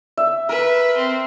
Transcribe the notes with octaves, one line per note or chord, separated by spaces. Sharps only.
E5
A#4 B4 E5
C4